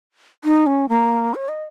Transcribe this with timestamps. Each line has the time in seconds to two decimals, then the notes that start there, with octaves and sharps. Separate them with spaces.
0.44 D#4
0.66 C#4
0.89 A#3
1.35 C#5
1.48 D#5